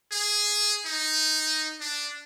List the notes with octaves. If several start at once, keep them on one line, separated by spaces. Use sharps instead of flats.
G#4
D#4
D4